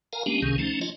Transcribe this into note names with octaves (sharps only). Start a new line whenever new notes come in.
A#4 F5 G#5 A#5
G#3 A#3 B3 C#4 D4 G4
C#2 C3 D#3 C#4 G#4
F3 A3 C#4 D#4
D4 F4 C#5 D#5